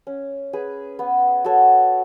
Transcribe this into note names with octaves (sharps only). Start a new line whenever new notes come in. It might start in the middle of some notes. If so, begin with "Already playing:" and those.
C#4
G#4 B4
B3
F#4 A4 C#5